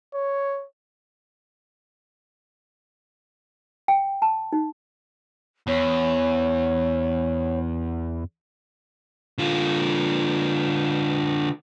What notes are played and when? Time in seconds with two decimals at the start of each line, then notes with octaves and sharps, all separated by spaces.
0.15 C#5
3.88 G5
4.22 A5
4.53 D#4
5.68 E2 C#5
9.38 D3 F4